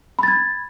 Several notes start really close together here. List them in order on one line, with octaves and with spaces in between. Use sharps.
B5 A6 G#6